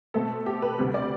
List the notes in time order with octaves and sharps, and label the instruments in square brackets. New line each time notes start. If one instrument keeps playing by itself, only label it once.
[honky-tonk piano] B2 A3 C4 A4
G4
B4
D2 C3 G3 C4
D5